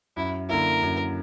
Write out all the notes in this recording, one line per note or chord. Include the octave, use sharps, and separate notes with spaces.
F#2 E4
D3 A#3 E4 A#4
F#2